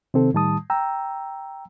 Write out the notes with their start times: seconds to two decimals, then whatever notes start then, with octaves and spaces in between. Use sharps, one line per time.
0.14 C3 D#3 C4 A4
0.33 A2 D#3 G3 A5 D#6
0.70 G5 A#5 E6